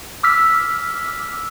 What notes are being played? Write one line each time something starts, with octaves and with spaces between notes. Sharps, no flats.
D6 E6 F6 B6